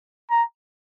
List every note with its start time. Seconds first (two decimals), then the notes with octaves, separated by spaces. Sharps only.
0.30 A#5